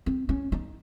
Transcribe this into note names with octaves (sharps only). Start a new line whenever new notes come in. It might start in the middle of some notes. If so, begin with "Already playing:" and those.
C4
C#4
D#4